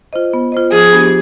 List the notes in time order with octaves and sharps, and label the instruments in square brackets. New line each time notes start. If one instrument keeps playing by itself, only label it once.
[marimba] F4 C5 D#5
B3
F4 C5 D#5
[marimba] F3 [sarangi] G#4
[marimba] B3 D4 G4